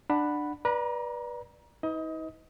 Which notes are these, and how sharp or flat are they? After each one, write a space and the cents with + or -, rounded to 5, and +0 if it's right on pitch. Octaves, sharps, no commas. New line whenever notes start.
D4 +20 F#5 +0 B5 +0
B4 -25 D5 +5 A#5 +25
D#4 +45 B4 +20 D#5 +25